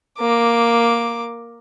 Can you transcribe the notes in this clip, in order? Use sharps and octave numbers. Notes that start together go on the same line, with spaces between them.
A#3 D6